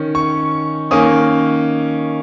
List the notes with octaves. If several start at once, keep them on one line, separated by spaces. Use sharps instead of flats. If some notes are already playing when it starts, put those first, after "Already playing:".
Already playing: D#3 C#4
C#6
D#3 A#3 C#4 D#6